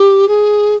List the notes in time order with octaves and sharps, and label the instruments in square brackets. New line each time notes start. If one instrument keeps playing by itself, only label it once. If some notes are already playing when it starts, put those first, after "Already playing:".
Already playing: [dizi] G4
G#4